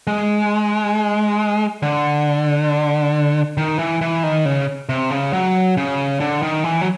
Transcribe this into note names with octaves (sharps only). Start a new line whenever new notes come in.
G#3
D3
D#3
E3
E3
D#3
C#3
C3
C#3
F#3
C#3
D3
D#3
E3
F#3